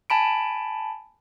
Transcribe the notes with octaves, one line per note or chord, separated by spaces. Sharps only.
G#5 A5 B5 D7